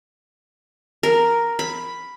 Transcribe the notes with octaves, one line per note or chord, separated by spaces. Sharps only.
A#4
B5